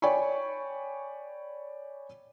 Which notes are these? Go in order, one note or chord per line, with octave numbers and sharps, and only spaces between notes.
C#5 D5 G5 G#5 B5 C#6